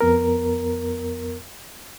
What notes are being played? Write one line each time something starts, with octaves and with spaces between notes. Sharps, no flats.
F2 B3 A#4